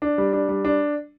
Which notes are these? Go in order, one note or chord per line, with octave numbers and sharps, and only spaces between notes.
D4
G3
D4
G3
D4